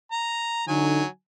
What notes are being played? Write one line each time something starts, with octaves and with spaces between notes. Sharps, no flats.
A#5
D3 F#3 D#4 G#5